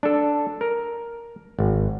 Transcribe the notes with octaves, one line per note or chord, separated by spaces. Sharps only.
D4 A4
A#4
G#1